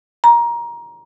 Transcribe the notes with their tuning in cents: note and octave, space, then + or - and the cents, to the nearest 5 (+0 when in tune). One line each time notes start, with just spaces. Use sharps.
A#5 +20